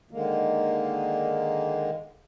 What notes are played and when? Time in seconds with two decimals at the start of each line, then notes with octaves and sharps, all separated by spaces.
0.11 D3 D#3 G#3 A#3